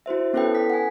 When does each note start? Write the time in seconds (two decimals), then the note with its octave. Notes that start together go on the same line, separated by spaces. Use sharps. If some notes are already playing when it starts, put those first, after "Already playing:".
0.06 E4 F#4 C5 E5
0.33 B3 C#4 E4 A4 B4 G5
0.51 D#6 B6
0.70 F#5 G#5